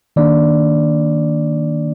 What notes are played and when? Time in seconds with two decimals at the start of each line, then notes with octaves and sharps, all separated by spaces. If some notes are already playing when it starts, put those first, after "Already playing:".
0.16 D#3 A#3 D4 D5